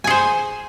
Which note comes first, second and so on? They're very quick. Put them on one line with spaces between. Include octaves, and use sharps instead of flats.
G#5 G#4 C5